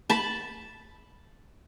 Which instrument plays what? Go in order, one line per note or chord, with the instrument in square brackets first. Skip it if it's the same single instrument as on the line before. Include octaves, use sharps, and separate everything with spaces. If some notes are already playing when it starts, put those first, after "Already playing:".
[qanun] A5 B5